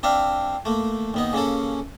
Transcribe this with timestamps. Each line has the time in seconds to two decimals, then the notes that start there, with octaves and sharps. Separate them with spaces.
0.03 C4 D4 E5 F5
0.65 A3 A#3
1.14 D#2 B3 D#4
1.33 C#3 A#3 C#4 A4